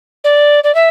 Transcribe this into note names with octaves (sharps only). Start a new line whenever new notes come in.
D5
D5
E5